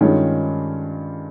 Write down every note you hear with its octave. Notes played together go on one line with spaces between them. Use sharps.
G2 D#3 G#3 C#4 F4